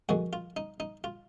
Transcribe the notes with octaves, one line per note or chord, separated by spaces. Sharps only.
F2 D#3 G#3 F#4
F4
D#4
D#4
F4